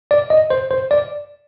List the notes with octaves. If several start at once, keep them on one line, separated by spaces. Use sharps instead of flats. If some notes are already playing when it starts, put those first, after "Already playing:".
D5
D#5
C5
C5
D5